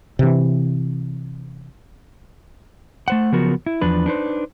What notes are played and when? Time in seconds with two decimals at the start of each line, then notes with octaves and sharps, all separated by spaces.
0.19 C3 E3
3.08 A3 C5 F#5
3.32 C#3 F3 F#3 B3 F#4 A#4
3.66 E4
3.81 E2 F3 D4 B4
4.06 D4 D#4 B4 C5